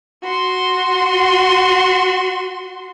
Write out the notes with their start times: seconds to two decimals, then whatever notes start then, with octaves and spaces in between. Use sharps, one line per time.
0.23 F#4 C6